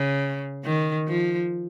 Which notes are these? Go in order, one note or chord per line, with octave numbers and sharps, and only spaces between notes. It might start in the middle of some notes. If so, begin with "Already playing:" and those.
Already playing: C#3
D#3
F3